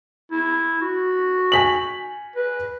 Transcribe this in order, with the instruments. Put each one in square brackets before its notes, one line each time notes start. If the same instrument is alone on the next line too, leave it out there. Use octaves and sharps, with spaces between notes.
[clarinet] E4
F#4
[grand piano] G#5 B6 F#7
[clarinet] B4